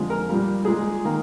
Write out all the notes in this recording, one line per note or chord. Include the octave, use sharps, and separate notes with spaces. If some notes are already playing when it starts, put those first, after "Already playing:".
Already playing: F2 D3 F3 G#3
A#4
A#2 G3 A#3
A#2 G#3 G#4
D#3 A#3